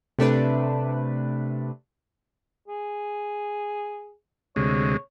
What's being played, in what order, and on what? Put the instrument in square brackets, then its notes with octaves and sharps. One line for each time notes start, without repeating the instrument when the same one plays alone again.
[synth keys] C3 A3 D4 B4
[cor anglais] G#4
[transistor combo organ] D2 C3 G#3 [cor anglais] C#5